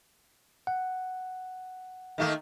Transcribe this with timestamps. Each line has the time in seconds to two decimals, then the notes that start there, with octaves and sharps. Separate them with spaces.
0.67 F#5
2.18 D#3 A3 A#3